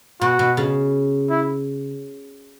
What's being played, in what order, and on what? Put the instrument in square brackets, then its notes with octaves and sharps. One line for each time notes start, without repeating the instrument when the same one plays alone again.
[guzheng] B2 [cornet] F#4
[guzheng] B2
C#3
[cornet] E4